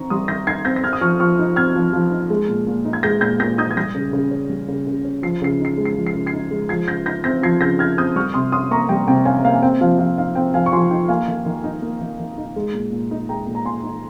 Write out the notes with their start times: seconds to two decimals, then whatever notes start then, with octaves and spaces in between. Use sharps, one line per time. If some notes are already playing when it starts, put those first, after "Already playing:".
Already playing: D#3 C4 D#4 A#5 C#6
0.10 G3 C6 D#6
0.28 D#3 G6 A#6
0.47 D#4 G#6 C7
0.65 C4 G6 A#6
0.76 A#6
0.84 C4 F6 G#6
0.93 D#6
1.01 F3 C#6 F6
1.20 F3 C#6 F6
1.39 D#4
1.56 C4 F6 G#6
1.76 F3
1.93 F3
2.11 D#4
2.30 G#3
2.49 A#2
2.67 A#2
2.85 D#4
2.93 G#6
3.03 G#3 G6 A#6
3.21 A#2 G6 A#6
3.40 A#2 G6 A#6
3.58 D#4 D#6 G6
3.71 G#6
3.77 G3 G6 A#6
3.95 C#3
4.13 C#3
4.31 C#4
4.49 G3
4.69 C#3
4.87 C#3
5.05 C#4
5.23 F3 C7
5.42 C#3 C7
5.60 D#4
5.65 C7
5.77 G#3
5.85 C7
5.96 F3
6.07 C7
6.15 C#3
6.27 G#6 C7
6.33 D#4
6.51 G#3
6.69 F3 G#6 C7
6.87 C#3 G6 A#6
7.06 D#4 G6 A#6
7.24 C4 G6 A#6
7.43 F3 G#6 C7
7.61 C#3 G6 A#6
7.79 D#4 F6 G#6
7.97 C4 D#6 G6
8.16 G3 C#6 F6
8.34 C3 C6 D#6
8.52 C#4 C6 D#6
8.71 A#3 A#5 C#6
8.89 G3 G5
9.08 C3 G5
9.25 C#4 F5 G#5
9.44 A#3 F5
9.54 G#5
9.62 C4 G5
9.81 F3 F5
9.99 F3 F5
10.18 D#4 F5
10.35 C4 G5
10.54 F3 F5 G#5
10.66 C#6
10.72 F3 G#5 C6
10.91 D#4 G5
11.09 A#3 F5 G#5
11.28 D#3
11.46 D#3
11.64 D#4
11.82 A#3
12.01 D#3
12.19 D#3
12.38 D#4
12.56 G#3
12.74 A#2
12.92 A#2
13.11 D#4
13.29 G#3 G5 A#5
13.47 A#2
13.55 A#5
13.65 A#2 G#5 C6
13.83 D#4